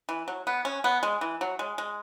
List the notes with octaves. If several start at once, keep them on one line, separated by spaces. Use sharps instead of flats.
E3
F#3
B3
C#4
B3
G#3
E3
F#3
G#3
G#3